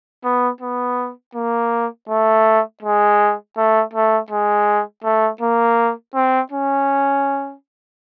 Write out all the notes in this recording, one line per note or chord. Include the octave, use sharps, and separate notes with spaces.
B3
B3
A#3
A3
G#3
A3
A3
G#3
A3
A#3
C4
C#4